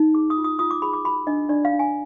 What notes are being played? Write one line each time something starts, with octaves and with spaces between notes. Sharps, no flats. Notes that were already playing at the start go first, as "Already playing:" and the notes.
Already playing: D#4
G#4 D6
D#6
F4
D#6
F4 D#6
D6
G#4 B5
D6
F#4 B5
D4 D#5
D4 D5
F5
D4
G#5